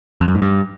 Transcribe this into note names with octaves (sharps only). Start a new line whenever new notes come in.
F2
F#2
G#2
G2